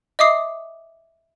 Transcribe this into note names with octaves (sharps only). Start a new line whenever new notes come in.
D#5 E5 D6 D#6 C7